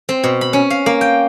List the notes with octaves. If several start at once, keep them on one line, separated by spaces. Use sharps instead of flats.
C4
B2
B5
C#4
F5
A#3
G5